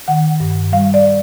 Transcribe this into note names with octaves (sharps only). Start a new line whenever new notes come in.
D#3 F#5
G2
G3 F5
D5